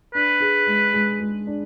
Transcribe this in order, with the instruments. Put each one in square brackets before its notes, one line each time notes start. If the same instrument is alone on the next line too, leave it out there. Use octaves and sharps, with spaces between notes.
[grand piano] D4 [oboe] B4
[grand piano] G#4
G#3
G#3
G#3
D4